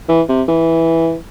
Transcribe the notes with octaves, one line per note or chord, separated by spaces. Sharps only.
E3
C3
E3